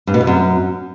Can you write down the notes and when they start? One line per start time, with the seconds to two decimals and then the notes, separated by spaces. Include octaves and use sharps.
0.07 G2
0.14 B2
0.21 G2
0.27 F#2